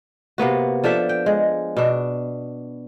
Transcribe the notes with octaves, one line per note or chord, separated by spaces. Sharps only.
C3 A#3 B3 F#4
F3 D4 A4 E5
G5
G#3
B2 D4